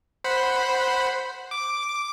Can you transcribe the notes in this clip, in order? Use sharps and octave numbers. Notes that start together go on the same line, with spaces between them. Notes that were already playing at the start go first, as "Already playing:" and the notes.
C5 F#5 B5
D6